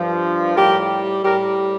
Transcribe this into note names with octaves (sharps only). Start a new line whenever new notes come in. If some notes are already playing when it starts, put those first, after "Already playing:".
Already playing: G2 F3
A2 G3 G4 A#4
A2 G3 G4 A#4